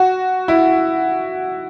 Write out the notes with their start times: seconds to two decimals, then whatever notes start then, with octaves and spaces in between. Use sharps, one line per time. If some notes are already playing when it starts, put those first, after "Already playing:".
Already playing: F#4
0.48 E4